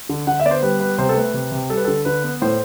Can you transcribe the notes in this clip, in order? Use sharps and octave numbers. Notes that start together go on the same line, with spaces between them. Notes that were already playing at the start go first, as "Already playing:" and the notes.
D3
D3 F#5
E5
B3 D5
C5
G3 B4
B3 B4
C3 C5
A4
A3 B4
C3
C3
G3 A4
B4
D3 A4
D3 B4
B3
A2 C5